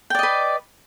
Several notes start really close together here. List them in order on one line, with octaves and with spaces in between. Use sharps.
G5 D5 D#5 B4